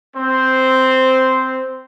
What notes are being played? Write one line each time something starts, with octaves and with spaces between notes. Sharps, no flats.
C4 C5